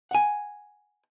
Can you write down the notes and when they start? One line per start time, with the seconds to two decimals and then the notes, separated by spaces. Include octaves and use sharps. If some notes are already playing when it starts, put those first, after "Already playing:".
0.11 F#5 G#5